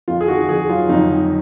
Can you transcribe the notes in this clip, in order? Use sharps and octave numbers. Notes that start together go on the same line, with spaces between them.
F2 F4
G#4
D#3 F#4
F2 G#4
F#3 F4
F2 D#4
D#3